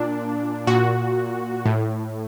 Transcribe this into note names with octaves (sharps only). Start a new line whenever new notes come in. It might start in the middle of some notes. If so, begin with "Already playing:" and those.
Already playing: A#2 D4
A#2 F#4
A2